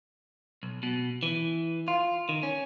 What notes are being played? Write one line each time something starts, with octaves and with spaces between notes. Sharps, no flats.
B1
B2
E3
F4
D#3
C#4